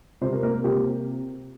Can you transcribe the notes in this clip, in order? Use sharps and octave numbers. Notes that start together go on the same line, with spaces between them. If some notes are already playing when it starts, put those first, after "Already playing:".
C3 C5
A#4
A#3 A#4
C3 G4